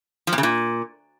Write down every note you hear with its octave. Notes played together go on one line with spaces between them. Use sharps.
F3
A#2
C#3
A#2